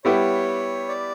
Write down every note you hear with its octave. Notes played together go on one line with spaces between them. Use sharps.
G3 B3 E4 G4 C#5
D5